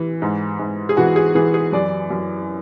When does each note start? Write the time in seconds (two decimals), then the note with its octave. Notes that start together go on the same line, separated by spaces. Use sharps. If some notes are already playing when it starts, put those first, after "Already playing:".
Already playing: E3
0.22 G#2
0.59 G#2
0.89 G#4
0.97 E3 F#4
1.16 G#4
1.35 E3 G#4
1.54 G#4
1.72 F#2 D5
2.10 F#2